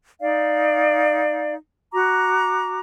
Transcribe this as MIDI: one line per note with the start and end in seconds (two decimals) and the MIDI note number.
0.20 1.55 63
0.20 1.55 74
0.20 1.55 77
1.93 2.80 66
1.93 2.80 82
1.93 2.80 86